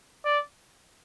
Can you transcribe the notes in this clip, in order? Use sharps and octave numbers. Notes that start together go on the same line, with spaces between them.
D5